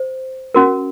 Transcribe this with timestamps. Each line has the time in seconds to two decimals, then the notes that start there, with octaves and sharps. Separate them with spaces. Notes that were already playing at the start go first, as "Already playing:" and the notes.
Already playing: C5
0.55 C#4 F#4 A#4